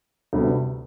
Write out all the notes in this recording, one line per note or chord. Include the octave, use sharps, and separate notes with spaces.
D2 C3 G3 B3